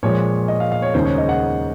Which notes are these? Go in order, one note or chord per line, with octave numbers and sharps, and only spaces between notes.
A#2 F3 G#3 C#5
D#5
F5
F5
C#5
D#2 C#3 G#3 D#4 C5
C#5
D#5
F#5